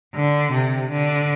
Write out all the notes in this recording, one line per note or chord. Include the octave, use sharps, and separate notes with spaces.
D3
C3
D3